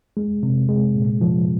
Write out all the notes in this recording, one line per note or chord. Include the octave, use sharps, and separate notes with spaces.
G#3
C3
G#3
A#2
F3